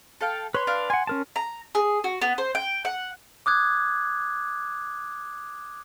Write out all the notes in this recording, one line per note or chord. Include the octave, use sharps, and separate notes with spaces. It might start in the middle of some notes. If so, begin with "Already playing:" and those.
A4 F5 G5
B4 C#5 C6
D4 F5
F#5 G#5 C6
C#4 A#4 A5
A#5
G#4
F#4
B3
C5
G5
F#5
D6 D#6 F#6 G#6